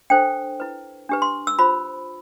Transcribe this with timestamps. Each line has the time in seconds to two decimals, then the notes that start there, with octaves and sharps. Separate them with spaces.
0.10 D4 A4 C5 G5
0.60 E4 B4
1.09 D4 G4 B4
1.22 C6
1.47 E6
1.59 F4 C5 B5